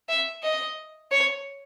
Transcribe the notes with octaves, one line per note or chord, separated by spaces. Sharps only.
E5
D#5
C#5